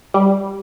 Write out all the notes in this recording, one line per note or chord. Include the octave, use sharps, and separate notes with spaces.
G3